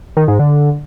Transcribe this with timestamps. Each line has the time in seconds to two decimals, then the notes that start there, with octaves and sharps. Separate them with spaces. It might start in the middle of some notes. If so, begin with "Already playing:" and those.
0.17 D#3
0.28 G#2
0.39 D3